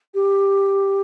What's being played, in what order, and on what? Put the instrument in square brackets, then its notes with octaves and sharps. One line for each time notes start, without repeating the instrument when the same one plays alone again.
[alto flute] G4